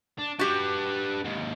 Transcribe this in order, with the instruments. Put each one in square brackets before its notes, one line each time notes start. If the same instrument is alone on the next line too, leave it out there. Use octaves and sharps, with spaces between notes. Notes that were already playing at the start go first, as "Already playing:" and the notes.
[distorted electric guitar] D4
[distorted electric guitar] D4 B4 [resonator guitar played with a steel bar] F#4 G4
[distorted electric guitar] D#2 G#2